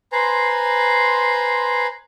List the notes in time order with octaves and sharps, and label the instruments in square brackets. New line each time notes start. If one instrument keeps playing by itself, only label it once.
[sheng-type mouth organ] B4 C5 G#5 A#5 C6